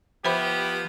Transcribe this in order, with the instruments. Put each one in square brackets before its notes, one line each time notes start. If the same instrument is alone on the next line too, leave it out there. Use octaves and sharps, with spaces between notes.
[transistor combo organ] F3 [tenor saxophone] B3 [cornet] G4 [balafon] C5 E5 B5